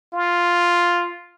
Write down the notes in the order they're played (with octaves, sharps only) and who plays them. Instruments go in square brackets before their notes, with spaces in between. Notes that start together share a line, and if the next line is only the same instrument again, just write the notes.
[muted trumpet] F4